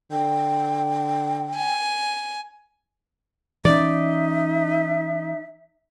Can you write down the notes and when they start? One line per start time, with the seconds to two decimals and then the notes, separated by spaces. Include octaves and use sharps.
0.12 D3 G5
1.57 G#5
3.65 E3 C#4 D#4 D5 E5